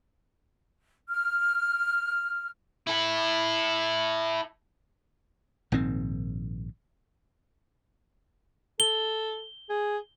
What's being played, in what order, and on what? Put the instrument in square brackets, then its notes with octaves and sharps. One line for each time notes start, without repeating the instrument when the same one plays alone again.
[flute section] F6
[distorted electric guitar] E4 A4
[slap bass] A#1 G#2 D#3 C4
[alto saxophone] A4 [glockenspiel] G7
[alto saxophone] G#4